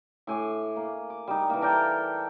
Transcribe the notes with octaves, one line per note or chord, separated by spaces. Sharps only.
A2 G#5 D6
A#3
D6
G3 D#4
E3 A#3
A4 A#4 D5 G5